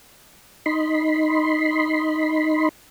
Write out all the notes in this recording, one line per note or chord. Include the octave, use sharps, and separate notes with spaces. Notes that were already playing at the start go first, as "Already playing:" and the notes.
D#4 B5 C6